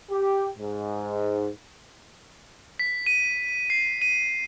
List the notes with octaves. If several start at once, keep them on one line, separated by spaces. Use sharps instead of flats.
G4
G#2
B6
D#7
C7
D#7